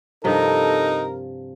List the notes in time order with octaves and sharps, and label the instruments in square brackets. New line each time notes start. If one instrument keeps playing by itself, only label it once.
[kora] G2 C3 F3 [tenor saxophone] D#4 [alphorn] A4 [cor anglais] A#4